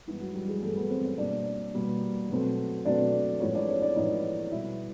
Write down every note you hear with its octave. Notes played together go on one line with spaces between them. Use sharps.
G2 E3 G#3 B3 E4
F#3 F#4
G3 G4
G#3 G#4
G2 E3 G#3 A3 B3 A4
B3 B4
C4 C5
C#4 C#5
B2 G3 A#3 D4 D5
B2 G3 A#3
B2 F#3 A3 C4
B2 F#3 A3 C4 D4 D5
A2 F3 G#3 B3 C#4 C#5
D4 D5
C#4 C#5
D4 D5
A2 F3 G#3 B3 D#4 D#5
B2 G3 B3 E4 E5